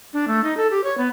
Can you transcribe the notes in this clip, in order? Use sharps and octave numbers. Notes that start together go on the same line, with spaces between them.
D4
A3
D#4
A4
G4
C#5
B3